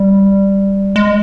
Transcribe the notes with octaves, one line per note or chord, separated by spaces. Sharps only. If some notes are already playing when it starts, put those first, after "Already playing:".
Already playing: G3
G#3